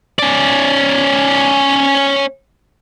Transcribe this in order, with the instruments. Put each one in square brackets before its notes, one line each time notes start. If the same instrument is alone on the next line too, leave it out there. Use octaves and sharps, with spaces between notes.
[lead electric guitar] C#4 D5